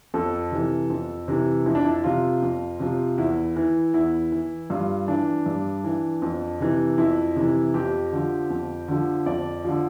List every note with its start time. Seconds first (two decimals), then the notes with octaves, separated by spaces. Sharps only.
0.14 F2 A4
0.52 C3 E3
0.90 F2
1.28 C3 E3
1.66 F2 E4
1.75 D4
1.84 E4
2.04 C3 F3 F4
2.42 F2
2.80 C3 F3
3.18 E2 E4
3.56 E3
3.94 E2 E4
4.32 E3
4.70 G2 F4
5.08 E3 D4
5.46 G2
5.84 E3
6.22 F2
6.60 C3 E3
6.98 F2 E4
7.36 C3 E3
7.74 F2 G4
8.12 D3 F3
8.50 F2
8.88 D3 F3
9.26 F2 D5
9.64 D3 F3